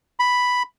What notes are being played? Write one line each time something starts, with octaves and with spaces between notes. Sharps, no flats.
B5